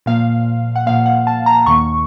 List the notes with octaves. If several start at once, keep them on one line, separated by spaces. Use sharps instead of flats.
A#2 F3 A#3 F5
F#5
A#2 F3 A#3 F5
F#5
A5
A#5
D#2 D#3 A#3 C#6